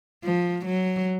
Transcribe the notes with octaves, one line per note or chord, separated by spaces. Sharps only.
F3
F#3